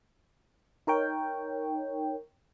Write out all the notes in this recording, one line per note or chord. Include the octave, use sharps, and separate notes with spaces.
D#4 A#4 C#5 G5